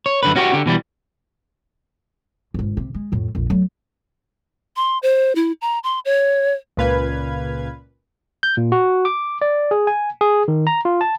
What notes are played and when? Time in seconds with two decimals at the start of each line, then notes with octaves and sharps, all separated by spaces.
0.06 C#5
0.23 F#2 D3 B4
0.36 C#4 F#4 G4 C5 C#5
0.54 D3 G4
0.66 B2 E3 G3
2.54 G1 G#2
2.77 C3
2.94 G#3
3.12 F2 A2
3.35 A#1 F2
3.50 F#3 A3
4.76 C6
5.03 C5
5.35 E4
5.62 A#5
5.84 C6
6.05 C#5
6.77 C#2 A#2 B4 F5 G#6
8.43 G6
8.57 A#2
8.72 F#4
9.05 D6
9.42 D5
9.71 G#4
9.87 G#5
10.21 G#4
10.48 D#3
10.67 A#5
10.85 F4
11.01 A5